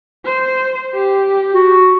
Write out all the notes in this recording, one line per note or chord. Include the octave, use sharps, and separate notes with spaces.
C5
G4
F#4